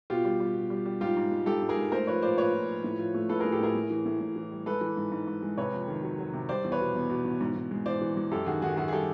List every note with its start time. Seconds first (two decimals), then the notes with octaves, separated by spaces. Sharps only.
0.10 B2 F4 G4
0.25 G3
0.40 G3
0.55 B2
0.70 G3
0.86 G3
1.01 G#2 F4 G4
1.17 G#2
1.31 G#3
1.46 G#2 G4 A4
1.62 G#2
1.69 G#4 A#4
1.77 G#2
1.92 A3 A#4 C5
2.07 F3 B4 C#5
2.22 A#2 C5 D5
2.38 A#2 B4 C#5
2.53 A#2
2.68 F3
2.84 A2
2.99 F3
3.14 A3
3.29 A2 A4 B4
3.40 A2 G#4 A#4
3.52 G4 A4
3.60 A2 G#4 A#4
3.75 A2
3.90 E3
4.05 A2
4.20 A2
4.36 E3
4.51 G3
4.66 G#3 A4 B4
4.81 E3
4.97 G#2
5.12 G#2
5.27 G#2
5.42 G#3
5.57 C3 B4 C#5
5.73 F2
5.88 D#3
6.03 F#3
6.19 F#3
6.33 C3
6.49 G3 C5 D5
6.64 E2
6.72 B4 C#5
6.80 B2
6.95 E2
7.09 B2
7.25 E2
7.41 G#2
7.56 G#2
7.71 G#3
7.85 E3 C5 D5
8.01 E3
8.17 G#3
8.31 F#2 G4 A4
8.46 D#3 F#4 G#4
8.62 D#3 F#4 G#4
8.77 F#2 F#4 G#4
8.88 G#4
8.92 G3 G4 A4